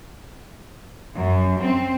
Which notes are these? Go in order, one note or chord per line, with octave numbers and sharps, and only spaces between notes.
F#2
C4